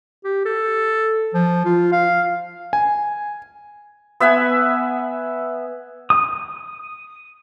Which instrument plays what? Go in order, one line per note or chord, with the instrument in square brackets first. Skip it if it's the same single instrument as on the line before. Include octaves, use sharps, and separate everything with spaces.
[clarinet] G4
A4
F3
F4
F5
[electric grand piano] G#5
[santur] B3 E5 F#5 G#5
[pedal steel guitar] D#6